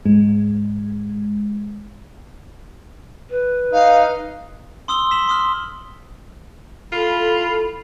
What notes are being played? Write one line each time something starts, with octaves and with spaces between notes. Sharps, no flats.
G#2 G#3
B4
D#4 F5
C6 D#6 E6 G7
B6 E7 F#7
C6 D#6 F6
A3 E4 F4 A4 B5